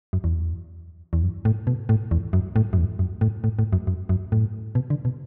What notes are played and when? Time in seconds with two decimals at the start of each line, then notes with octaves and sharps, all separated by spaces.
0.13 F#2
0.24 E2
1.13 E2
1.23 F#2
1.45 A2
1.67 B2
1.89 A2
2.11 E2
2.33 F#2
2.56 A2
2.73 F#2
2.78 E2
2.99 F#2
3.21 A2
3.44 A2
3.59 A2
3.73 F#2
3.87 F#2
4.09 F#2
4.32 A2
4.75 B2
4.90 D3
5.05 B2